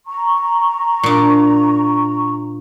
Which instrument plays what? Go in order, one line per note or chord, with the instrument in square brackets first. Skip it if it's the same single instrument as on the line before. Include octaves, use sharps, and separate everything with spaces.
[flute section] A#5 C#6
[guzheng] A#2 D4